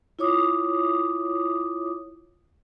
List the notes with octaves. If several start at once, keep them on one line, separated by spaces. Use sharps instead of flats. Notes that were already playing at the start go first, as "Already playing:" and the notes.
E4 F4 C#5 D6 D#6